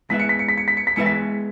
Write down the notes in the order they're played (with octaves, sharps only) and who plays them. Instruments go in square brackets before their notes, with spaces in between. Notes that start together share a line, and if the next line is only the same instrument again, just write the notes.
[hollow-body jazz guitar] G#3 B3 E4 B4 E5 [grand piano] B6
[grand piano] C#7
B6
C#7
B6
C#7
B6
C#7
B6
[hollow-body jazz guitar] G#3 B3 E4 B4 E5 [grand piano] C#7
[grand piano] B6